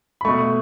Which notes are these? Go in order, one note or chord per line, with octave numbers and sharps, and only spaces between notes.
B5
B2 A3 C#6